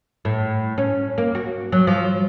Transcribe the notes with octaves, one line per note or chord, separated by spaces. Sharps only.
A2
C#4
A#3
F#4
F#3
F3